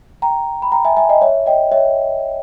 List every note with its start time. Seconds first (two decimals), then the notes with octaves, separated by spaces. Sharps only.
0.22 G5 A#5
0.62 B5
0.72 G5 A#5
0.85 E5 G#5
0.97 E5 G#5
1.09 D#5 G5
1.21 C#5 E5
1.46 D#5 G5
1.72 C#5 E5